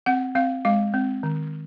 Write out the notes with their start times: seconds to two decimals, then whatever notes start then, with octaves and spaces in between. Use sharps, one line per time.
0.06 C4 F#5
0.35 C4 F5
0.65 G#3 F5
0.94 C4
1.23 D#3